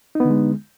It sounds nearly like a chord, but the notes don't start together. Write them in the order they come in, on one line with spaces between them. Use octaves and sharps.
D#4 B3 D3 G#3